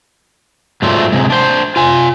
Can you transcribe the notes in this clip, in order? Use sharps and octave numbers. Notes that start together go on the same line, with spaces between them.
G#2 F#3 A3 F4 D5
C3 G#3
D4 C5
F4 G#5